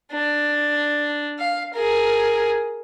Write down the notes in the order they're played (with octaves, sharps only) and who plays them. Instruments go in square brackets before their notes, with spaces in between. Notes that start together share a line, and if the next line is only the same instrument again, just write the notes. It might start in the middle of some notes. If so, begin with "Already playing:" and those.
[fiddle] D4
F5
G#4 A#4